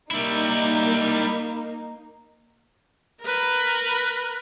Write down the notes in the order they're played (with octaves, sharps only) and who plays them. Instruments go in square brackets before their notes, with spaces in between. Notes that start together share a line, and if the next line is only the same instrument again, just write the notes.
[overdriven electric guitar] G3 E4 [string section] A#3 D#4
[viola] A#4 B4